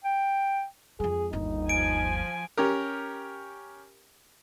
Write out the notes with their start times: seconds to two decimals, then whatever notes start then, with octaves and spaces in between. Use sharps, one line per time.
0.04 G5
1.00 F2 G#3 G#4
1.33 G1 D#2 D#4
1.69 F3 G#5 D7
2.57 C#4 G4 A#4